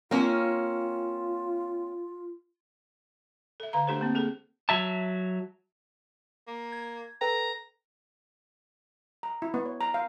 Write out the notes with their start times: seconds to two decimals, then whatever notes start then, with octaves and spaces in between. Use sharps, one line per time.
0.11 A#3 C4 C#4 F4
3.60 A4 E5
3.73 D3 F5 A#5
3.87 A3 D4 G4 A4 C5
4.01 A#3 C4
4.15 A#3 G#4 A4
4.69 F#3 E5 A5
6.48 A#3
6.72 G#6
7.21 A4 B4 G5 A#5
9.23 A#5
9.42 E4
9.54 B3
9.65 C#5
9.81 A#5
9.94 F5